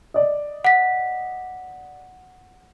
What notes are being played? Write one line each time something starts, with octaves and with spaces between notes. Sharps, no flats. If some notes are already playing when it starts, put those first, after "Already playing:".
D5 D#5
F#5 B6